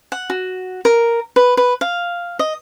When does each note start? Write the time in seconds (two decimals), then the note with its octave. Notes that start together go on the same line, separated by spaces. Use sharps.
0.12 F#5
0.30 F#4
0.85 A#4
1.36 B4
1.57 B4
1.81 F5
2.39 D#5